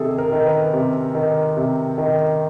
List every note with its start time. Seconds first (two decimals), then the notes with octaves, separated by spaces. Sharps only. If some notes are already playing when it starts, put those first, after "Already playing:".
Already playing: C3 D#3 G#4 A4
0.18 A#4
0.32 D#3
0.46 B4
0.73 C3
1.15 D#3
1.57 C3
1.98 D#3